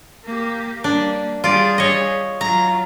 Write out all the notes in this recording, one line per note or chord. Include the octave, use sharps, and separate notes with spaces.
A#3 G4
G3 A#3 D4
G3 F4 G#4 D5
C#5 D#5
F#3 F4 A#5